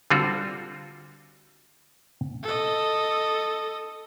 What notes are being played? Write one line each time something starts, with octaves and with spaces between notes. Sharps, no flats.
D3 G3 C4 F4 F#4 A4
A4 D#5